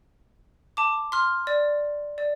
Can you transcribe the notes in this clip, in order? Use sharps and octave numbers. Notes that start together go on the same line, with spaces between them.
A5 D6
C6 F6
D5
D5